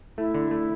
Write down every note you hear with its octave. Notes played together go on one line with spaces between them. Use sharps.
A3 E4
D3
A3